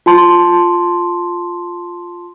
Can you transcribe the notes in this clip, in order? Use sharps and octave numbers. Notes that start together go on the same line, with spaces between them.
F4 A5 C6